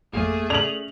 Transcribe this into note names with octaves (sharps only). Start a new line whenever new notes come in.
G#1 F2 A3 A#3 G#4 F5
C#4 D5 F7 F#7